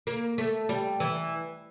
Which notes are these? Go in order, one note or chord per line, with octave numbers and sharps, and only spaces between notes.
A#3
A3
G3
E3